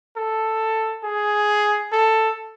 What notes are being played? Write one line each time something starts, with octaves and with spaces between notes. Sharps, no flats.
A4
G#4
A4